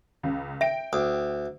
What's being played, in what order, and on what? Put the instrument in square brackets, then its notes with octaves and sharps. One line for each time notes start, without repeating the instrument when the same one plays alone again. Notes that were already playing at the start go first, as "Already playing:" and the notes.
[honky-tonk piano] C#2 C#3
[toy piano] E5 [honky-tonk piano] G5 D7
[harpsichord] D2 [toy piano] D#6